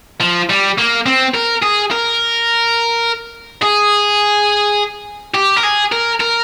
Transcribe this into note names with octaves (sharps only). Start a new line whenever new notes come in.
F3
G3
A#3
C4
A#4
G#4
A#4
G#4
G4
A#4
G#4
A#4
A#4